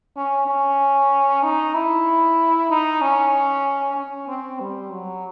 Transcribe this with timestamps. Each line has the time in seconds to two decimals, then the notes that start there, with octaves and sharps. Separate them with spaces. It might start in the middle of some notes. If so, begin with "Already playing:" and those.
0.17 C#4
0.48 C#4
1.43 D#4
1.75 E4
2.70 D#4
3.02 C#4
3.97 C#4
4.28 C4
4.60 G3
4.92 F#3